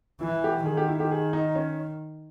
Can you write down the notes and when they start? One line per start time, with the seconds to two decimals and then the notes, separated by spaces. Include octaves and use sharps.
0.21 E3 E4
0.44 G4
0.65 D#3 G#4
0.77 G4
0.89 E4
1.00 G4
1.11 G#4
1.33 D#4
1.55 C#4